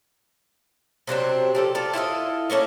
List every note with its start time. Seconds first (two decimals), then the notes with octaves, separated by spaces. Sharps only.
1.07 C3 F#3 C4 D4
1.55 F3 G4 A4
1.75 F4 A4 D5
1.93 E4 F4 A4 D#5
2.50 A3 A#3 C#4 D4